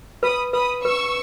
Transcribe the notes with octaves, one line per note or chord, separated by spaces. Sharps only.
B4 B5 D#6
B4 B5 D#6
B4 C#6 E6